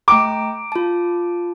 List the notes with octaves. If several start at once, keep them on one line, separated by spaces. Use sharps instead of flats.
A3 G5 A#5 D6
F4 A5